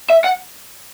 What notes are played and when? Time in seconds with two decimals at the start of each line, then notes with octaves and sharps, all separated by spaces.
0.10 E5
0.24 F#5